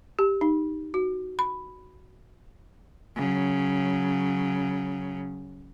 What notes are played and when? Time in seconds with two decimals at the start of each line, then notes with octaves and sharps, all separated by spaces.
0.19 G4
0.41 D#4
0.94 F#4
1.39 B5
3.16 C#3 F#3